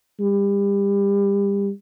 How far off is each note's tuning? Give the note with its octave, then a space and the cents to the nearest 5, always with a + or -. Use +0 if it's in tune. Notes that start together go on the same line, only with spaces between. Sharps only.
G3 +30